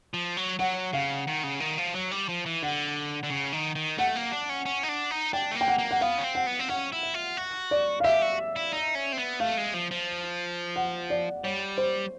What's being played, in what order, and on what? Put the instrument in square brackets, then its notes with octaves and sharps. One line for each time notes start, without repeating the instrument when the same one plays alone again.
[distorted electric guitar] F3
F#3
[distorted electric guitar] F#3 [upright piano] F#5
[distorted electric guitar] C#3 [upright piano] F5
[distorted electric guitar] D#3
C#3
D#3
F3
F#3
G3
F3
E3
[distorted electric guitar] D3 [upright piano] F#5
[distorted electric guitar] D3
C#3
D#3
D#3
[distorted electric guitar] A3 [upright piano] F#5
[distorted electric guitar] A#3
D4
C#4
C#4
D#4
D4
D#4
[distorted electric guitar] D4 [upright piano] G5
[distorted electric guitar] A3
[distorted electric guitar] A#3 [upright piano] G5
[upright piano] F#5
[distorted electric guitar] A#3
[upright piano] F#5
[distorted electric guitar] B3 [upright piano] F5
[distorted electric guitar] C#4
C4
[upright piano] F#5
[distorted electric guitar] B3
C4
[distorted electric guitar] C#4 [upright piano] F#5
[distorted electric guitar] E4
[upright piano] E5
[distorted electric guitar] F4
F#4
[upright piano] D5
F5
[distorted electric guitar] G4 [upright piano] E5
[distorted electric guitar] F#4
E4
D#4
C#4
C4
B3
[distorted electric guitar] A3 [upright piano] F5
[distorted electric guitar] G#3
F3
F3
[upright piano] F#5
D5
[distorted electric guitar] G3 [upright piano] C#5
[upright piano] C5